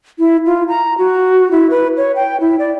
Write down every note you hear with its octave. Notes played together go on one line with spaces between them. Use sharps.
E4
F4
A#5
F#4
E4
B4
C#5
G5
E4
D5